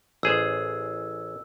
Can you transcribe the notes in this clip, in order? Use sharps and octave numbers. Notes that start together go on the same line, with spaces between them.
A1 G#4 C5 E6